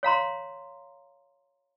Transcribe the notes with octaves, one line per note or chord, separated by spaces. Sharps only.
C#5 F5 A#5 C6